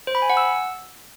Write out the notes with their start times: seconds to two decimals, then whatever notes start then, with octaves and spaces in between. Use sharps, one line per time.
0.07 C5
0.15 B5
0.22 G#5
0.30 F#5
0.37 E6